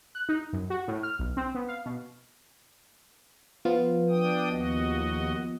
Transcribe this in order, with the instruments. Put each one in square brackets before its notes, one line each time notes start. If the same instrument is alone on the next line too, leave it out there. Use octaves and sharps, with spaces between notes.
[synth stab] F#6
D#4
F#2
F#4
A2
F6
B1
C4
B3
F5
B2
[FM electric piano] F3 B3 F4
[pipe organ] D4 G5 D#6
D#2 F#4 D#5